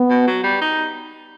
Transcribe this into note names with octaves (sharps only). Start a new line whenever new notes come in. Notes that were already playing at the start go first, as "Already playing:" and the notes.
Already playing: B3
B2
F#3
G3
D#4